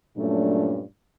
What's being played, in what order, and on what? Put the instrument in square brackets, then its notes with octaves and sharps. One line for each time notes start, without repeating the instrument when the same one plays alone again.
[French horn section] G2 A#2 F#3 A3 C#4 D4